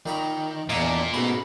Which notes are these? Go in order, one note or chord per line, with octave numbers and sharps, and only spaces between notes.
A#2 D#3 A#5 B5
E2 A#2 A#3 D4 D#5 E5 D6
G#2 B2 A3 C#4 A5 B5